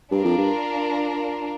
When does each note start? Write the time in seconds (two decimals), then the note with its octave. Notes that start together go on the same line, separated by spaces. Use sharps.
0.11 G2 D4 F4 A#4
0.24 F2
0.38 G2